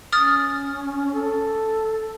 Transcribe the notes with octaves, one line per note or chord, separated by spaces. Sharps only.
C#4 D#6 F6 A6
A4